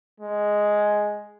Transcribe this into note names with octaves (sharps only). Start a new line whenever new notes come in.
G#3